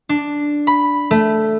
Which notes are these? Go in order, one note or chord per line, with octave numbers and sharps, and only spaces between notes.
D4
B5
A3